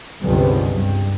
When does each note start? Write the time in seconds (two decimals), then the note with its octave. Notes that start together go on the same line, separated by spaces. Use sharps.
0.22 G1 C#2 G2 C3 B3
0.74 G2